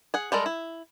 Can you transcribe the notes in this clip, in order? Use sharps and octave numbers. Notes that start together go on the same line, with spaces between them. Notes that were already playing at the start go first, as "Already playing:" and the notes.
G#4 F#5
G3 G#3 A4 A#4
E4